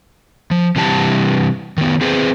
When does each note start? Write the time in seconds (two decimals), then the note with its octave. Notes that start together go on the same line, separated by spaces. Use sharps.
0.51 F3
0.76 C3 E3 G3 A5
1.78 D#3 B3
2.01 C4 G#4 B4 C5